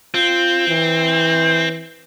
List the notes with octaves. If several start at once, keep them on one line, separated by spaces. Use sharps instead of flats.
C4 F4
E3